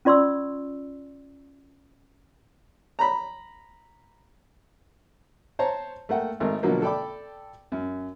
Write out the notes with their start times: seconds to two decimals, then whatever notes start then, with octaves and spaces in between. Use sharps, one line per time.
0.05 C#4 F4 D5 C6 C#6 E6
2.99 A#5 B5
5.59 C5 C#5 A5 A#5
6.09 A3 A#3 F#5 G5
6.40 G#1 A3 A#4 F6
6.63 B2 D3 F3 F#3 A#3
6.82 A4 D5 G5 B5 D6
7.72 F#2